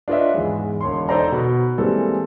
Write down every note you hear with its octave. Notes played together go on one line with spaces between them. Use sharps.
D4 F4 B4 C#5 D#5 E5
E2 G#2 G#3
E1 C#5 C6
D#4 A4 C5 D5 A#5
B2 B5
E3 G3 G#3 A#3 C4 A4